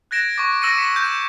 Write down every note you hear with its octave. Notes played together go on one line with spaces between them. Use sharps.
F#6 G#6 A#6 D7 E7
C#6 D6 A6
D6 E6 A#6 C#7 D#7
B6 C#7 E7
G6